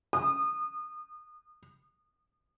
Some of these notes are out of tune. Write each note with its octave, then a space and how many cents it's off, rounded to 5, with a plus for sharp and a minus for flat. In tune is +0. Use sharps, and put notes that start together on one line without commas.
D#6 -25